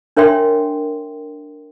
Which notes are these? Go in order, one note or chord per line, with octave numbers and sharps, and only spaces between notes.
D4 A#4 C#5 E5 G5 C6